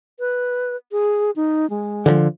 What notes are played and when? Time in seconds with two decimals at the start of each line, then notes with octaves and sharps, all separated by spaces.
0.20 B4
0.92 G#4
1.36 D#4
1.70 G#3
2.06 D3 E3 F3